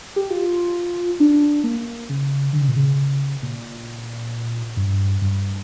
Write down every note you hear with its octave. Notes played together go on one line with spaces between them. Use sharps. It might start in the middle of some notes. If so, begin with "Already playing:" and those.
G4
F4
D4
A#3
C#3
D3
C#3
A#2
C#3
A#2
G2
G2